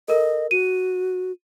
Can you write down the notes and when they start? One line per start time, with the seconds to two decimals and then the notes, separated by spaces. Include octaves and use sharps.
0.08 A4 A#4 D#5
0.51 F#4 D#7